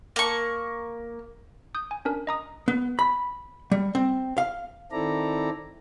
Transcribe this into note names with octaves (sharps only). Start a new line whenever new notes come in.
A#3 C#6
D#6 G6
G#5
C#4 D4 A#4
D#5 A#5 D#6
B3
B5
G3
C4
F5
D#3 C4 E4 A4 D5 A#5